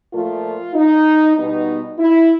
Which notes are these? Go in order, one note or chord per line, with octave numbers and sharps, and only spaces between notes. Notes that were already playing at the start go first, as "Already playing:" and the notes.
A#2 F3 A3 F4
D#4
B2 G3 B3 D#4
E4